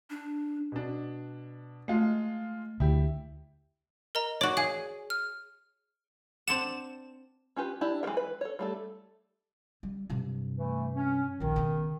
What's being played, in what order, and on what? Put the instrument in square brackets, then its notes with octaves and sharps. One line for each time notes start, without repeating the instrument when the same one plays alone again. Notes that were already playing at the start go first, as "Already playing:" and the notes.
[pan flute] D4
[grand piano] B2 D4
[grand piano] G#3 F4 [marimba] A3
[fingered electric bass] D2 [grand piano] E4 G4
[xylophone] A#4 D#5 A#5
[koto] F#4 D5 [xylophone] C#5
[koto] G#4 [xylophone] F5
[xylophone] F6
[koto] C4 D4 F#5 [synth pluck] E7
[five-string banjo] C#4 F4 G4 B4
D4 E4 G4
E3 G#3 F4 A#4 G5
B4
A4 C#5
G3 A3 A4
[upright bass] G3
G2 C3
[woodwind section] E3 A3
C#4
[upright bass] A#1 D#2 [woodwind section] D#3
[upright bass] C#3 B3